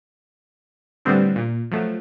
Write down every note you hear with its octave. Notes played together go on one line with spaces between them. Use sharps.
A2 D3 G3 B3 C4 D4
A#2
F3 F#3 A3